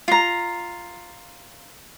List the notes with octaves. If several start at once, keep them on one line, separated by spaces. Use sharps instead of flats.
F4 A#5